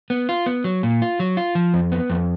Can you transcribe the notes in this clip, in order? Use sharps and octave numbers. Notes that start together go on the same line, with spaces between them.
B3
F4
B3
F#3
A#2
F4
F#3
F4
F3
F2
B3
F2